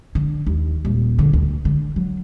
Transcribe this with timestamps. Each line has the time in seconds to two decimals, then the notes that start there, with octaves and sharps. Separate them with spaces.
0.15 D3
0.47 D#2
0.85 D#1
1.19 D3
1.33 D2
1.65 D3
1.96 F#3